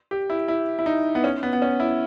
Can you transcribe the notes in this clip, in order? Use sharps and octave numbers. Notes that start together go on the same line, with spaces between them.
G4
E4
E4
E4
D#4
B3
C#4
B3
B3
C#4
E4